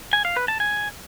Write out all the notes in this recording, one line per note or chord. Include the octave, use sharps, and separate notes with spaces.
G#5
F5
B4
A5
G#5